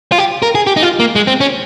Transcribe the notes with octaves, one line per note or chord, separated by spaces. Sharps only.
F4
G4
A#4
G#4
G4
D#4
F4
A#3
G#3
C4
C#4